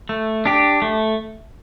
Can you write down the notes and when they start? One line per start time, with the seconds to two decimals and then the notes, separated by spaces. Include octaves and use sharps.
0.09 A3
0.45 D4 G4
0.82 A3